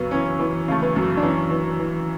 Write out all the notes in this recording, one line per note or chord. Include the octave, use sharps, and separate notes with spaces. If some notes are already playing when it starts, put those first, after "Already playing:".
Already playing: F#2 C#3 B3
E3 C#4
E3 B3
C#3 A3
B3
F#2
D4
E3 C#4
E3
E3